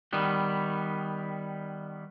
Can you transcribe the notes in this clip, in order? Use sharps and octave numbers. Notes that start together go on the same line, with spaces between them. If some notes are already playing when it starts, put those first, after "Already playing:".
D#3 G3 B3